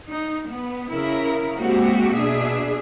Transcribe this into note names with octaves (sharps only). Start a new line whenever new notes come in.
D#4
B3
C#3 E4 A#4
G#3 A#3 C4 F#4 G4
B2 D4 G#4 E5